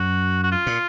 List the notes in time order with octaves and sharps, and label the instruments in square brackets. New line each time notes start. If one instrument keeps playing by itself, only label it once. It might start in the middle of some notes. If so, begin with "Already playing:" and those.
Already playing: [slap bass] F#2 [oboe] F#4
[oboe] F#4
F4
[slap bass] A#2